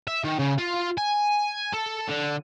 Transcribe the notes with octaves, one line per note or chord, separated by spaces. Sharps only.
E5
D#3
C#3
F4
G#5
A4
D3